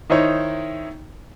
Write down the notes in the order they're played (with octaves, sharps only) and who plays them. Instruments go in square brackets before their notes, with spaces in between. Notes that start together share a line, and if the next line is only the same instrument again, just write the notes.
[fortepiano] D#3 D#4 E4 C5 C#5